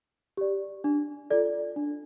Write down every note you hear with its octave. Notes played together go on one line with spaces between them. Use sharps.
G4 D5
D4
F4 A4 D5
D4